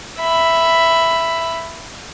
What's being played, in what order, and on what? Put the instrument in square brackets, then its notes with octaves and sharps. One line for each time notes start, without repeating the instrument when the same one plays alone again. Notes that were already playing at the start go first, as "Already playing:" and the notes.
[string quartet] E5 B5